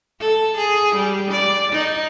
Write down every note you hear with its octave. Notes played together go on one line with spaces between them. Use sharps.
A4
G#4
G3
D5
D#4